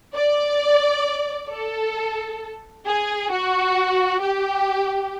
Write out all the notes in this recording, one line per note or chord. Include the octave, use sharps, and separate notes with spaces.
D5
A4
G#4
F#4
G4